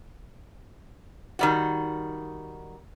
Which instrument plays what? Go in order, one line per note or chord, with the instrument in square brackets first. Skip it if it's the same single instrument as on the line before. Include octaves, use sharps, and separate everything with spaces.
[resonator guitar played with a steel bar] D#3 G3 F#4